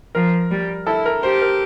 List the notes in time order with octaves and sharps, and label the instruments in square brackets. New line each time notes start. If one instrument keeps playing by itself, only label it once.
[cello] F3 [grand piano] A#4
[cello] G3
[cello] E4 [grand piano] A4
[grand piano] A#4
[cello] G4 [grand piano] C5
[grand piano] A#4